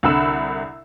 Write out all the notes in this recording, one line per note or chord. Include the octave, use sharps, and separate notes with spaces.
C2 D3 F#5 B5 E6 E7